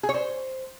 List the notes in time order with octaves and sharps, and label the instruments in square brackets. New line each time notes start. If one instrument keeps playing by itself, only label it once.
[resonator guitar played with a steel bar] G#4
C#5
C5